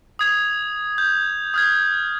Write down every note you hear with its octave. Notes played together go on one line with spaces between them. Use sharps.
D#6 G#6 F7
G6
D#6 F6 G#6